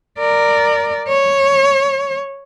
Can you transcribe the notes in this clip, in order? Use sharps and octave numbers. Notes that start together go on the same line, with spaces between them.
A#4 D5
C#5